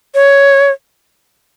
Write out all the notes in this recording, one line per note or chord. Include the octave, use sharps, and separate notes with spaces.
C#5